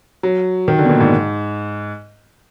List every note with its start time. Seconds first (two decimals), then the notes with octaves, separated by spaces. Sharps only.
0.23 F#3
0.68 D#3
0.78 D3
0.85 B2
0.89 A#2
1.00 G#2